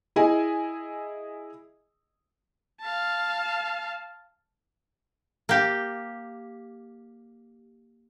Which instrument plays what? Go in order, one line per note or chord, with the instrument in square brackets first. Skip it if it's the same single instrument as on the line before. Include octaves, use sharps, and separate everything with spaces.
[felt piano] E4 G#4 D#5 G#5
[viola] F5 A5
[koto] A#3 G4